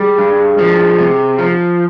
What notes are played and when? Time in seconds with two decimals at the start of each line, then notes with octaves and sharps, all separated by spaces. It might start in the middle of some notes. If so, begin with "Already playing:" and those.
Already playing: G3 G#4
0.18 G2
0.59 F3
0.98 C3
1.39 F3